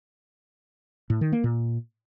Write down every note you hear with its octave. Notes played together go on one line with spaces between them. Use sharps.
A2
D#3
A#3
A#2